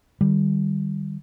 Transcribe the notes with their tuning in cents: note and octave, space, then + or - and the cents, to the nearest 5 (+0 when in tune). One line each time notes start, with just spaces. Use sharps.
D#3 -35 G3 +0